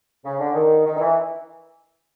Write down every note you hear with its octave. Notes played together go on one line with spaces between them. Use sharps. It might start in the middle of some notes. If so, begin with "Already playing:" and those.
C#3
D3
D#3
D#3
D#3
E3